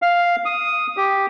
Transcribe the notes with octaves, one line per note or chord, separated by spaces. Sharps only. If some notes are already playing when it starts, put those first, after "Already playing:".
F5
D#6
G4